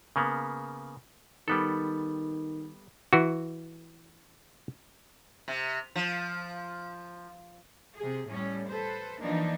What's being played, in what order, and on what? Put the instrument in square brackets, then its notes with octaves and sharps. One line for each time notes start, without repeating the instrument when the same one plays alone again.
[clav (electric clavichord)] C#3 A#3 B3
[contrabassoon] D#3 [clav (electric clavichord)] G3 B3 A4
[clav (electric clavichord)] E3 F#4
[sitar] C3
F3
[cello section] C3 G#4
A2 G3 C#4
A4 B4 C5
E3 F3 A#3 D4 D#4